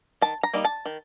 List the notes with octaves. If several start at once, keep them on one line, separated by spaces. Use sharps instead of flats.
D#3 A5
A#5
G3 A#3 D#4
A5
D#3